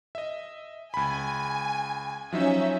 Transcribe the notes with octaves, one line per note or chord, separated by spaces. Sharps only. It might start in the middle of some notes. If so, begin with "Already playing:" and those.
D#5 E5
C#2 G#5 B5
F3 F#3 C#4 D#4 E5